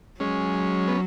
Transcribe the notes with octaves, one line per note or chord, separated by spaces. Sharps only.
F#3 G#3 C#4
B3